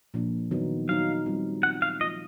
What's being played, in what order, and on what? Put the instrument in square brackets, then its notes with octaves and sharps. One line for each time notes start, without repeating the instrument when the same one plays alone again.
[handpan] A#2 F3 A#3 D4
D#3 F#3 B3 D#4
[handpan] D#3 F#3 B3 D#4 [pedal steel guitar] F5
[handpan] G3 C4 F4
[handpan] G3 C4 F4 [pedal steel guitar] F#5
[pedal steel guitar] F5
[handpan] F3 A3 C4 F4 [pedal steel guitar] D#5